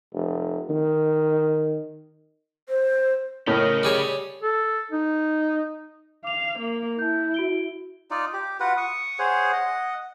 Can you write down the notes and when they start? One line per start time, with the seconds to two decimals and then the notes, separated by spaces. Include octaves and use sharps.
0.13 F1
0.70 D#3
2.69 C5
3.47 A2 C#3 C#4 A#4 D#5
3.83 G3 G#4 C#5
4.42 A4
4.92 D#4
6.24 F5 D6 F7
6.58 A#3
6.99 E4 A5 G6
7.34 F#4 D7 G7
8.11 D#4 F4 D5
8.33 G4
8.60 F4 F#4 B4 F#5
8.77 C#6 D#6
9.19 G#4 C5 C#5 F#5
9.53 D#5 F#5